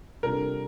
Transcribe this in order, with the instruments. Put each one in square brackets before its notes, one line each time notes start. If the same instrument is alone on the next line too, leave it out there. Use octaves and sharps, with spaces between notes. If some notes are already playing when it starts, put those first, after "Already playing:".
[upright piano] C3 G3 D4 F4 A4 [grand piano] A#4